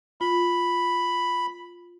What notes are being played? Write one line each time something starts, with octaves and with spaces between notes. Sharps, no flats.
F4 B5